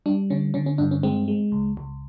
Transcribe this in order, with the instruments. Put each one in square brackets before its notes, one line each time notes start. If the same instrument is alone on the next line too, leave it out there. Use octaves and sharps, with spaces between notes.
[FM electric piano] G3 D4
D3 C#4
D3 C#4
C#4
G2 D4
C#4
G#3 C4
G#3
C#2
C#2